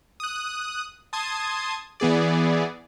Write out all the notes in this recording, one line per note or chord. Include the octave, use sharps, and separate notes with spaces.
D#6 F#6
A5 C6 D#6 G#6
E3 B3 G#4 D5